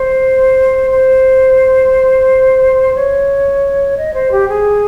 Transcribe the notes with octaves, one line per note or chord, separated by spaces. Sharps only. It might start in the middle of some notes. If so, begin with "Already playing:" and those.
Already playing: C5
C5
C#5
D#5
C5
G4
G#4